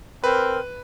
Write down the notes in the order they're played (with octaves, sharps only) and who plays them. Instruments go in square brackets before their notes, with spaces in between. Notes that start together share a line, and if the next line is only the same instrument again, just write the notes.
[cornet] C4 [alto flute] A#4 [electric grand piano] B4